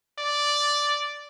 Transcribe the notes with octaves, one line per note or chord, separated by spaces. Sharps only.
D5